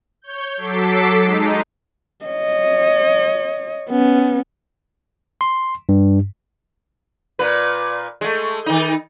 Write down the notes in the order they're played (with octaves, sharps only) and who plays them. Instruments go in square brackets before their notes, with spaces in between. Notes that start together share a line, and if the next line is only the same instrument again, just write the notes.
[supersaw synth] C#5 G6
F#3 A4 D6 B6 C7
G#3 D#4
[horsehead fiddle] C#5 D#5
B3 C#4
[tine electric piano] C6
G2
[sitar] A#2 B4
G#3 A3
D#3 D#4